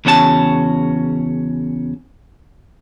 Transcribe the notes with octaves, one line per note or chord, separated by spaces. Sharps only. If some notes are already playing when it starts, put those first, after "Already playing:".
E2 C#3 C#4 F#4 A4 A5